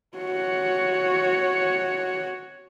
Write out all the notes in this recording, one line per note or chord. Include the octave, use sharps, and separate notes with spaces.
F#4 C#5